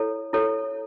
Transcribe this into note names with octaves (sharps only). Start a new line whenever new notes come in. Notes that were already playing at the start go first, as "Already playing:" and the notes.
Already playing: E4 A4 C#5
E4 A4 C#5